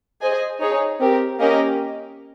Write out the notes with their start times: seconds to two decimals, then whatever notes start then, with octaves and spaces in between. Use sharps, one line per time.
0.21 G#4 C5 D#5 G#5
0.61 D#4 G#4 C#5
1.00 C4 G4 A#4
1.39 A#3 C#4 G4 A#4 D#5